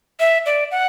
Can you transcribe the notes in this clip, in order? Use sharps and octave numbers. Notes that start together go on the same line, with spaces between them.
E5
D5
F#5